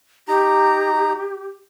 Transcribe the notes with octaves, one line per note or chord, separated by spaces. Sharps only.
D#4 G4 A#5